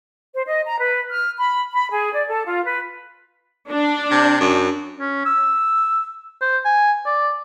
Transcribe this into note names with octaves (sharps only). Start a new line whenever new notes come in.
C5
D#5
A#5
B4
F6
B5
B5
G#4
D5
A4
F4
B4
D4
C3
F#2
C#4
E6
C5
G#5
D5